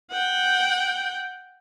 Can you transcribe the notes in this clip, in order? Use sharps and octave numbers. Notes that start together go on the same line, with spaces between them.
F#5 G5